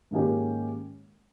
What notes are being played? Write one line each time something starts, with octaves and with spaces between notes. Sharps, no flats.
G#2 D#3 A#3 C#4 G4